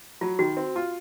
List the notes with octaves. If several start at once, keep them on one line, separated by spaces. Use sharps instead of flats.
F#3 F4
D#3 F#4
C4
F4